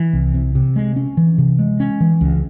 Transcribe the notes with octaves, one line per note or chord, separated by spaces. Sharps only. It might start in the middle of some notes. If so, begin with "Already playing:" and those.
Already playing: E3
C2
C3
C3
G#3
C#4
E3
C3
G#3
C#4
E3
C#2